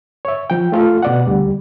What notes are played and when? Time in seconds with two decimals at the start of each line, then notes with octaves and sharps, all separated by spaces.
0.25 C#5 E5
0.50 F3 G5
0.72 A3 F4 A4 F5
1.03 B2 D5 F#5
1.27 D2 G3